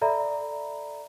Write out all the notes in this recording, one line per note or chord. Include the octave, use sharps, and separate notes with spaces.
A4 D5 E5 A#5 B5